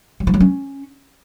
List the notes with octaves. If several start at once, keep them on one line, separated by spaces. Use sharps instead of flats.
F#3
F3
F#3
C#4